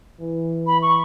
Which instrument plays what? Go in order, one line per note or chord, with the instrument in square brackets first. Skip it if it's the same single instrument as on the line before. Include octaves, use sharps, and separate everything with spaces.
[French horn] E3
[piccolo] B5
C#6